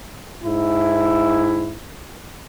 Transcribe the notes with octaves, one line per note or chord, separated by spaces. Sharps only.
G#2 E4